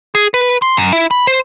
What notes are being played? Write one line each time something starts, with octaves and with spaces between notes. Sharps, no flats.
G#4
B4
C6
F#2
E4
B5
C5